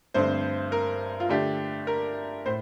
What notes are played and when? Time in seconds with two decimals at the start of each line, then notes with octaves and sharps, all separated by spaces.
0.14 G2 D3 A3 C4 C5
0.72 A#4
1.20 F4
1.30 D3 A3 D4 G4
1.87 A#4
2.46 A2 C5